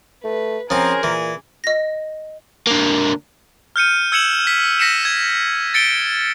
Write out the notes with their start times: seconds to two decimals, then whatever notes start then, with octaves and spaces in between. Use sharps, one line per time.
0.24 A3 B4
0.70 F3 C4 C#4 G#4 A#4 C5 A#5
1.03 A#2 E3
1.64 D#5 A#6
2.67 D3 A#3
3.76 F6 G6 C#7 D#7
4.12 E6 G#6 C#7 E7 F#7
4.47 B6
4.79 A#6 B6 C#7 D#7 E7
5.05 G#6
5.74 A6 C#7 D7 G7